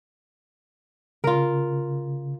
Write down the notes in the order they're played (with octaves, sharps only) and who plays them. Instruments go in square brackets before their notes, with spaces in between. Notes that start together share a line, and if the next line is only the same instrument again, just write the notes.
[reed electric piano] C#3 [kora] F4 A#4